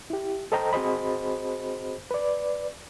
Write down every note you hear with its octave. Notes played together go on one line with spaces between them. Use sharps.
E4 G4
A4 C5 D#5 G5 A#5
C4 F#4 G#4 C5 D#5 B5
B4 D5